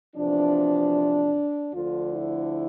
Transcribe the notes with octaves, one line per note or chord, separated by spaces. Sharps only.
E2 C3 F3 D4
D2 D3 F3 F4
E4